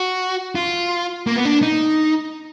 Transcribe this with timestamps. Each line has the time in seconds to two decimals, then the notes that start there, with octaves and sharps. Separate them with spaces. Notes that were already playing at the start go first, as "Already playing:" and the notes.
Already playing: F#4
0.55 F4
1.27 A#3
1.36 B3
1.45 D4
1.62 D#4